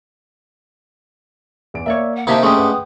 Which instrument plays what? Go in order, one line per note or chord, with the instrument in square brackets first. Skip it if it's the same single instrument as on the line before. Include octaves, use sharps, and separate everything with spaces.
[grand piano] E2 D7
[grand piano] A#3 [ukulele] C#5 D5 E5
[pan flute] F#5
[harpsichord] C3 D#4 G4 [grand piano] A#3 [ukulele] E4 A#4 A5 [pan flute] E5
[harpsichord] G#3 A3 [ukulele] C#4 D4 G4 [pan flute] D#6
[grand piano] B4 F#5 G5